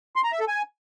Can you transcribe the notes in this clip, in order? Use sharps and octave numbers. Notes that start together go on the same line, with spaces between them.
C6
A#5
E5
A4
G#5